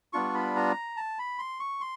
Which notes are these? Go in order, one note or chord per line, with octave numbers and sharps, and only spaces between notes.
G3 B3 D4 F4 C#6
B5
A#5
A5
B5
C6
C#6
C6